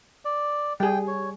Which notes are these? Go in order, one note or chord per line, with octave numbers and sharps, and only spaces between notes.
D5
G3 G#4 G5
C#5